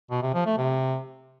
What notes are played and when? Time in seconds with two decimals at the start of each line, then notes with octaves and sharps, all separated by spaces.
0.11 B2
0.22 C3
0.34 F3
0.46 A3
0.57 C3